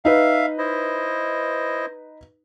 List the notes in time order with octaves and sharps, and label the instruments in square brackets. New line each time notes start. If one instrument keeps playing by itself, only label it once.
[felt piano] D#4 B4 [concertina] E5 F5
[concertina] E4 C5 D#5